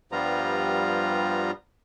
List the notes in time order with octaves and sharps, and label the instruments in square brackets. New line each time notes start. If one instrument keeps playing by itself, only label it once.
[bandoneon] G2 F3 G3 B3 F4 A#5